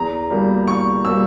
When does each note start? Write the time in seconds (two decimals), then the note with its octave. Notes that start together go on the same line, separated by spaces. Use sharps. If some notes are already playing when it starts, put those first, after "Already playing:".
Already playing: E2 A#5
0.30 B2 G3 A#3
0.67 E2 C#6
1.05 B2 G3 A#3 E6